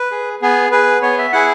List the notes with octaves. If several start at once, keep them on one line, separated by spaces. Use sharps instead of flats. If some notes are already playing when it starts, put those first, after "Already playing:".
Already playing: B4
G#4
B3 G#4
G#4 B4
B3 C#5
E5
E4 G#4 F#5